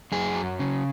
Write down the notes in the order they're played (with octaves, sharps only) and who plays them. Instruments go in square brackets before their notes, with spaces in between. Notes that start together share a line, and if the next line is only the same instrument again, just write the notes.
[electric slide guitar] F#2 G#4
F#3
C#3